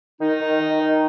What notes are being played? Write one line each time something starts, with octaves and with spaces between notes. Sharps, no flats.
D#3 D#4
D#3
D#3
D#3